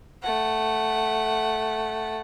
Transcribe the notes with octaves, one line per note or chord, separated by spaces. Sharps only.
A3 F#5